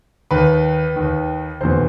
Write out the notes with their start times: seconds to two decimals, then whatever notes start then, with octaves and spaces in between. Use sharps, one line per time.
0.31 D#2 D#3 B4
0.96 D#2 D#3
1.60 F1 E2 B2 C5